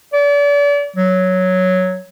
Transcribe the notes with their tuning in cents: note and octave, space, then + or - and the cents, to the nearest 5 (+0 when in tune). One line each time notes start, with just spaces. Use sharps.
D5 -35
F#3 +0